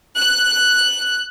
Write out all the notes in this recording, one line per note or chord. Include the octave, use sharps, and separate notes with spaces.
F#6